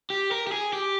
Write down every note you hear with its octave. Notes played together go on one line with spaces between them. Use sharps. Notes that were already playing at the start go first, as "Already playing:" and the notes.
G4
A#4
G4
G#4
G4